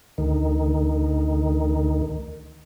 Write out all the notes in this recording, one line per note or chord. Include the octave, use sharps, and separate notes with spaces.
D2 D#3